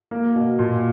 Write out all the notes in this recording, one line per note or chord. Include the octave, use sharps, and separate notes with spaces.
A#3
B2
A#2